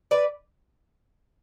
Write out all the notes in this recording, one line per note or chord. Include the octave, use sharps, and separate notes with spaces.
B4 D5